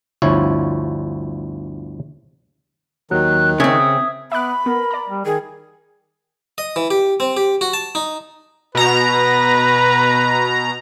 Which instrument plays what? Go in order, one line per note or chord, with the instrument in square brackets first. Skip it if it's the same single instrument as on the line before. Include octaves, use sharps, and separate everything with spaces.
[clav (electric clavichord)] G1 D2 F3 E4 C#5
[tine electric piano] D#2 F#3 [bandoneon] D#3 [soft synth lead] F#6
[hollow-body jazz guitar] C#3 C4 [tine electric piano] E5 G#6 [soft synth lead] D#6
[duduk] B3 [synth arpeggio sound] E5 D6 F#6 [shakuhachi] B5
[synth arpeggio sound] B3 [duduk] A#4
[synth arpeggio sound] D5 A#5
[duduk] G3
[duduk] D#3 [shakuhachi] G#4
[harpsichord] D#5
E3
G4
C4
G4
F#4
A5
D#4
[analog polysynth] B2 A#5 [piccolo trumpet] B4